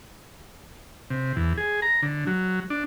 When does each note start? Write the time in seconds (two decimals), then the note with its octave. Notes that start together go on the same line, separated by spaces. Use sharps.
1.10 C3
1.36 E2
1.57 G#4
1.82 A#5
2.02 D3
2.27 F#3
2.70 D4